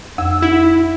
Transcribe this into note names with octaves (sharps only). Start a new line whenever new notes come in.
F2 E6
E4